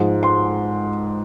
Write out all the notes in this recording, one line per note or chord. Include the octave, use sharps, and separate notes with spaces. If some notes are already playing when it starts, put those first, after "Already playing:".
Already playing: G#2 F3 G#3
C6